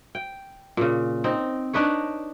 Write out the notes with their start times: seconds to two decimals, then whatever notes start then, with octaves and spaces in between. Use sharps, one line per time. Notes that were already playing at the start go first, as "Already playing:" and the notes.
0.15 G5
0.77 A#2 C#3
1.24 C4 D#4
1.73 D4 D#4 B4 C#5